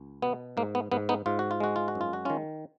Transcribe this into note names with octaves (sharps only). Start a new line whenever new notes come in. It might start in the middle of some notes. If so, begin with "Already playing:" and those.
Already playing: C#2
B2 B3
G#2 A#3
B3
G#2 B3
B3 D#4
G#2 F4
F#4
F4
G#3 F#4
F4
F#4
F#2
F4
F#4
D#3 C#4 F4